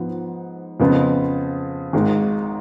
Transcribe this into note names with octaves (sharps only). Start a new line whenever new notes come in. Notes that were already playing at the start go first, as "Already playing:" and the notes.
Already playing: G#2 F3 B3
F2 C#3 F3 B3 F4
G#1 G#2 G#3